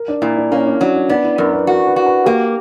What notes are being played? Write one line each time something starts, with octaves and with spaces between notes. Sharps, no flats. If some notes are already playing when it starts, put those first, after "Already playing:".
Already playing: A#4
D4
A#2 E4
D4
A#3 C#4
D4
F#3 D4
D4
B3 D4
E4
F#2 A#4
B4
F#4 A#4
B4
F#4
B4
A#3 G4